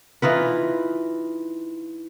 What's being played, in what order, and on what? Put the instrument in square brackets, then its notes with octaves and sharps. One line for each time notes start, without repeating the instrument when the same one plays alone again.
[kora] E3 D#4 F4 B4